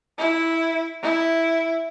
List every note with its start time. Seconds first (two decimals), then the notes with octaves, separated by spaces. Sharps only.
0.18 E4
1.02 E4